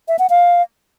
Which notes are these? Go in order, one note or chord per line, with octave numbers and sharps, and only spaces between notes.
E5
F#5
F5